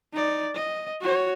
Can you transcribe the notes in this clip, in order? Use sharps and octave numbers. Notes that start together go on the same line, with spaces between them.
D#4 D5
D#5
F#4 C#5